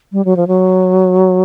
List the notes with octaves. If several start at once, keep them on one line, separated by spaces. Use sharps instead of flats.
G3
F#3
F3
F#3